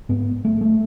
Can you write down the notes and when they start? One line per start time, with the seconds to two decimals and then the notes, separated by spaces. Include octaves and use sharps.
0.09 G#2 B3
0.45 A3
0.61 A3